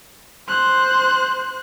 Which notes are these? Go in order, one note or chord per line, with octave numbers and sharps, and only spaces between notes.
C5 F#6